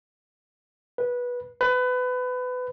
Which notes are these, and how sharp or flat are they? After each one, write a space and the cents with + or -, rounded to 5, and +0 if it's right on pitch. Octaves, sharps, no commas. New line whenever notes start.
B4 -15
B4 +25